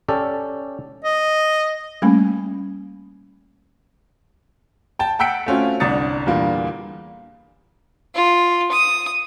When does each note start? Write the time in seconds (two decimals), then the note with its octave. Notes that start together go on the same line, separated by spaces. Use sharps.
0.08 C#4 G4 A4 D5
1.04 D#5
2.02 G3 A3 A#3 C#4
4.99 G5 A5
5.19 F#5 G5 E6 B6 C#7 D7
5.46 A3 C4 C#4 F4 F#4
5.80 G1 C2 D4 D#6 A6 C#7
6.27 E2 A#2 D3 G3 A#3
8.15 F4
8.71 D#6